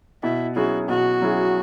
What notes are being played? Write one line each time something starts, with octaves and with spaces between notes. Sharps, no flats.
B2 E4
F#3 C#4 E4 F#4 G#4
B2 F#4
F#3 C#4 E4 G#4